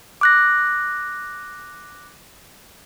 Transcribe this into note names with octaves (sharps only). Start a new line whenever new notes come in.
D6 F#6 A#6